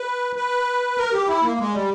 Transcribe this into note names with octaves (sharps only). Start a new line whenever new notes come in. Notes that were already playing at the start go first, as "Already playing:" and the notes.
Already playing: B4
B4
A#4
G4
E4
A#3
G#3
G3